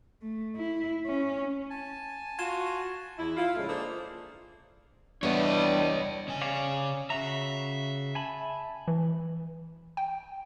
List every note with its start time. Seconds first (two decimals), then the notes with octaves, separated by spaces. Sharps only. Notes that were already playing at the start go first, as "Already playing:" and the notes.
0.22 A3
0.56 E4
1.06 C#4
1.70 G#5 A5
2.39 F4 F#4 G#6 E7
3.18 E2 E4
3.36 E4 F4
3.56 A2 C#3 F3 G#3 A3
3.68 A#3 D4 G#4 A4 C5
5.23 E2 G3 B3 D4 C#5 D#5
6.28 C#3 G#5
6.42 C#5 D5 F5
7.10 C#3 F#4 E5 A#5
8.15 G#5 A5 B5
8.88 E3
9.97 G5